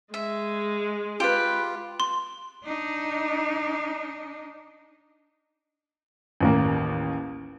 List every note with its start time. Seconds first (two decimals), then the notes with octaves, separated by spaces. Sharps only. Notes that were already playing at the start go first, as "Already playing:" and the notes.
0.14 G#3 E5
1.20 F4 G4 B4
2.00 C6
2.65 D4 D#4
6.41 A1 D#2 A#3